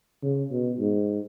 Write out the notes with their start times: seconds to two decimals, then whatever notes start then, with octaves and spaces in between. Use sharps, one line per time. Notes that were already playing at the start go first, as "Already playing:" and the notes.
0.23 C#3
0.51 B2
0.79 G#2